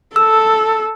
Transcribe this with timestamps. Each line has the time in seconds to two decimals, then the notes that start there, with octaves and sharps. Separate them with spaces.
0.16 A4 E6